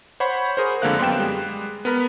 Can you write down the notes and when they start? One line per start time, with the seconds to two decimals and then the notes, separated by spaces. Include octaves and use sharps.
0.20 C5 C#5 F#5 B5 C#6
0.57 G#4 A#4 C5
0.82 F2 D3 G#3 A#3 F5 F#6
0.99 F#2 B3 G5 E7
1.19 G3 G#3
1.85 B3 A#4 B5